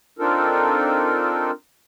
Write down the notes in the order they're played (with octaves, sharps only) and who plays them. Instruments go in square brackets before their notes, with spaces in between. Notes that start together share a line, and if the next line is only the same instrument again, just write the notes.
[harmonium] C4 D4 D#4 F4 A4 A#4